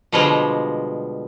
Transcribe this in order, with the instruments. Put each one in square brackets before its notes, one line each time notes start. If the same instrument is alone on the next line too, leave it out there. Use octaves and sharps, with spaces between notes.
[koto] B2 D3 F3 G3 G#3